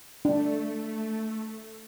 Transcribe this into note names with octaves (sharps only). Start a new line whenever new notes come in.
A3 D4